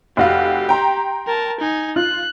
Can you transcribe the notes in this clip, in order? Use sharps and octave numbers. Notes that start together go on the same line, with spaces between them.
F1 F#4 G4 F5
G5 A#5 C6
A#4 A5
D#4 G#5
F4 F#6